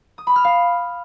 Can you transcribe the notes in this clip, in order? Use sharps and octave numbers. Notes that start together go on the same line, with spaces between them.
D#6
B5
F6
F5